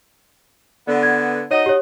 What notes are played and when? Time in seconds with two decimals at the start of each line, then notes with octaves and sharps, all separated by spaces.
0.87 D3 B3
1.03 G#6
1.51 D#4 F#4 C#5 D#5
1.66 G4 C#5